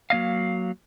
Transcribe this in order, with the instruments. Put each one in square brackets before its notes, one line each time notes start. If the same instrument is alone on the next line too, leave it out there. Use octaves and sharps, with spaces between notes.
[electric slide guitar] F#3 A#3 D#5 F5